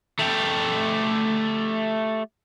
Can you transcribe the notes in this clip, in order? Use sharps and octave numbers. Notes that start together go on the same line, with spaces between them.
A3 G4